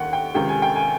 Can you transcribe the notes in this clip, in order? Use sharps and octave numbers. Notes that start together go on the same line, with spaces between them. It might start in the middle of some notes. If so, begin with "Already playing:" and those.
Already playing: D#2 D#3 F#5 G5
G5
C#2 C3 D#3 G5
G#5
G5
G#5